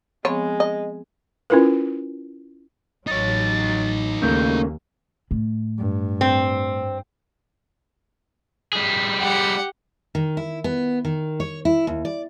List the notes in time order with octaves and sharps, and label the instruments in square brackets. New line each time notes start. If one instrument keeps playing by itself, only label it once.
[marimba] F3 B3 C4 [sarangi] G#3 [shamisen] C#5
[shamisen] D#5
[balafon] C#4 E4 F4 A#4 B4
[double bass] A1 F#3 [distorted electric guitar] D#4 C#5 [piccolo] A6
[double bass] D#2 [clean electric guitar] C#3 A3 A#3 [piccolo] G6
[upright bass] A2
[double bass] G2
[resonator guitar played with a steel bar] C4
[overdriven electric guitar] G3 G#4
[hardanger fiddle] G4 F#5
[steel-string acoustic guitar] D#3
E4
B3
D#3
C#5
E4
D#2
D5